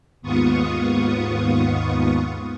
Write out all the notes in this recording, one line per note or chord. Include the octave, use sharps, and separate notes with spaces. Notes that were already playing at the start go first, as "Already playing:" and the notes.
D#2 G#2 B3 F4 C#6 D#6